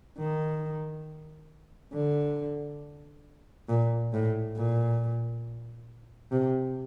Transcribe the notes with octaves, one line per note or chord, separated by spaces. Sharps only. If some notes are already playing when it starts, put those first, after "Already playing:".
D#3
D3
A#2
A2
A#2
C3